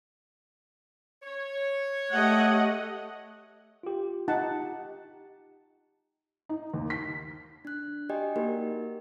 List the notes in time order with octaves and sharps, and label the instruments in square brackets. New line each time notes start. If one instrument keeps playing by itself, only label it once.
[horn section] C#5
[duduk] A3 [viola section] G4 D#5 F#5
[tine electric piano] F4 G4
[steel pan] D#4 F#5 A5
[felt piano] D#4
D#2
B6
[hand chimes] D4 F#6
F#4 G4 D5 D#5 G5 G#5
A#3 D#4 F#4 G4 A#4